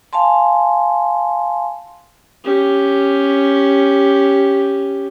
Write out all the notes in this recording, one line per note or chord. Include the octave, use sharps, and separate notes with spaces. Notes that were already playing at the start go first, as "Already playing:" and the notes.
F5 G#5 A5 C6
C#4 G4